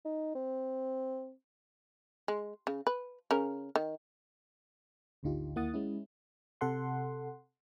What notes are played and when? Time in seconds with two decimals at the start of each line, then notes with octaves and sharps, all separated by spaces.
0.05 D#4
0.35 C4
2.28 G#3
2.67 C#3
2.87 B4
3.31 C#3 C#4 A#4
3.76 D#3
5.23 G#1 D2 D3 D#4 F4 G4
5.56 D#2 A#3 E4 F#5 D#6 A6
5.74 G#3 C#4 E4
6.61 C3 A4 F#5 C6